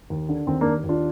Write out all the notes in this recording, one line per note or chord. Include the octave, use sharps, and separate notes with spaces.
D#2
D3
D#2 C4
D#2 A#3 D4
D#2 D4 F4